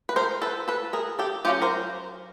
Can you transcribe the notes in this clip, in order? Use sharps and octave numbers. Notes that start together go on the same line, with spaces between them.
B4
A#4 C5
A4 B4
A4 B4
G#4 A#4
G4 A4
F#3 A#3 C#4 F4 G4
A#4 C5